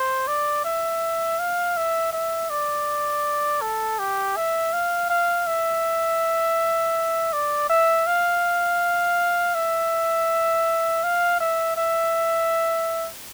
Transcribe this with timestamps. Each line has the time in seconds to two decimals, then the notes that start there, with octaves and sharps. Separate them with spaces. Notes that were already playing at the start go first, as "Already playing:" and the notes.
Already playing: C5
0.28 D5
0.65 E5
1.40 F5
1.77 E5
2.13 E5
2.50 D5
3.62 A4
3.99 G4
4.37 E5
4.73 F5
5.10 F5
5.47 E5
7.33 D5
7.70 E5
8.07 F5
9.55 E5
11.04 F5
11.41 E5
11.77 E5